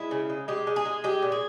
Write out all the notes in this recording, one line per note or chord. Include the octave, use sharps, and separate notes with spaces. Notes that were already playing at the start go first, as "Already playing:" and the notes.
Already playing: G#3 E4
C#3
G#3
G#3 G4
G#3
G#4
G#3
G#3 G4
A#2
G#4